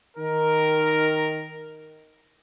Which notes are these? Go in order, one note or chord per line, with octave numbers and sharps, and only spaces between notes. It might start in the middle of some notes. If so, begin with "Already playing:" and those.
D#3 A#4